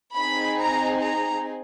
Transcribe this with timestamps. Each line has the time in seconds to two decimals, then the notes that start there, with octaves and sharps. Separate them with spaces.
0.16 C4 D#4 G#4 B5
0.59 A#5
1.00 A#5